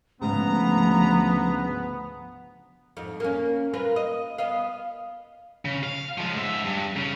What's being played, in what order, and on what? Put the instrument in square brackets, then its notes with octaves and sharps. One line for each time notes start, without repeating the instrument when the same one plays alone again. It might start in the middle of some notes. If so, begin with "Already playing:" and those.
[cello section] D2 F3 [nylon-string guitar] G#2 C#3 [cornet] B3 [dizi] A#5
[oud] F2 G#2
A#3 C#4
F4 A#4 B4
D#5
B3 D#5 F5
[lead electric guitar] C#3
F5
F3 G#3
G#2 E5
G2
C#3